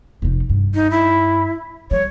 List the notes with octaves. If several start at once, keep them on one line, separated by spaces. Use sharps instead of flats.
F1 D#4
G2
D#4
E4
G3 C#5